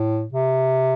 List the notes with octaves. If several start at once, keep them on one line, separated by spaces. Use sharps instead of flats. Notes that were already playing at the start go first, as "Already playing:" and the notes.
Already playing: A2
C3